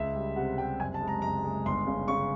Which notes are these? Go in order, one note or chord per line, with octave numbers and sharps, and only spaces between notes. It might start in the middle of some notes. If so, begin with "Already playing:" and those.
Already playing: C#2 E5
G3
C3 F#5
G3 G5
F#1 G#5
A5
G#3
A#5
F#1 A#5
G#3
G1 C6
C#3
C#3 C#6